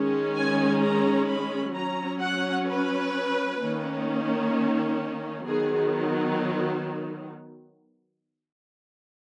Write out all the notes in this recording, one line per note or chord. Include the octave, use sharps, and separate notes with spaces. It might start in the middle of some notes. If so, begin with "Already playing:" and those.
Already playing: D#3 G#3 C#4
G#5
A#5
B5
F#3 C#4 A#5
F#5
B4
D#3 A#3 C#4
D#3 F#3 B3 G#4